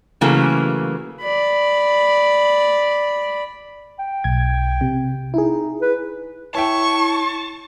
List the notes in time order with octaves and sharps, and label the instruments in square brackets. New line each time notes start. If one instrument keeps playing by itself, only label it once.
[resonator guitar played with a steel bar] C#3 E3 F#3 A3 A#3
[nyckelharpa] D5 B5
[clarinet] G5
[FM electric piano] B1 G#6
C3
[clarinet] D#4 [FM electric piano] E4 G#4
[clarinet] B4
[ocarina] E4 [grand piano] C#5 E5 G5 [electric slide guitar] A5 [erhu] C#6